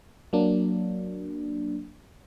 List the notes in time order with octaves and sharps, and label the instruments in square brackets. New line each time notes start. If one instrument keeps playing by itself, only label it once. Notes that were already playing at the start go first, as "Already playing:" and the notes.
[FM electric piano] F#3 A#3 D4